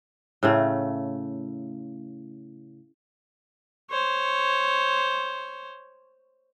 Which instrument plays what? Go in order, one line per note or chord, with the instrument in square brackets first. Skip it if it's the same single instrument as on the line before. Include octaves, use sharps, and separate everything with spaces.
[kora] A2 C#3 A3
[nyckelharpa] C5 C#5